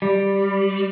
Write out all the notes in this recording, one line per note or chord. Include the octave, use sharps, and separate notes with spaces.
G3